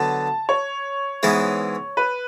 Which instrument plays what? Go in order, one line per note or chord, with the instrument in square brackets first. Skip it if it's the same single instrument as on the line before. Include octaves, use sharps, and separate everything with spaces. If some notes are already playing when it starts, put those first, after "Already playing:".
Already playing: [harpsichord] D3 F#3 B3 [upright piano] A5
[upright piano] C#5
[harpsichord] G#2 E3 G#3 B3 E4
[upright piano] B4